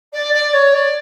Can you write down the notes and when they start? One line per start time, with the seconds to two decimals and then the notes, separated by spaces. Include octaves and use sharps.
0.13 D5
0.34 D5
0.53 C#5
0.74 D5